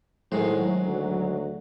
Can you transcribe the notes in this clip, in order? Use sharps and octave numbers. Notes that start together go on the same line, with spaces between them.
A2 D#3 F#3 G#3 C5
D2